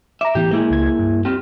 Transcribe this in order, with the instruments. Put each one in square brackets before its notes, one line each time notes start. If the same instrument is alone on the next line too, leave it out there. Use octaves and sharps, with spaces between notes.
[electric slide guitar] E5 [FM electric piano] A#5 D6
[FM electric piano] A2 E3 B3 [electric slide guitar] G4
[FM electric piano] G#3 [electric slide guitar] A#3 E4 G#4
[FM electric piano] C#2 G#6
G2
[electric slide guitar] C4 F4 G4